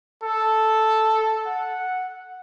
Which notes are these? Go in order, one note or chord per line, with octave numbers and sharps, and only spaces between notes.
A4
F#5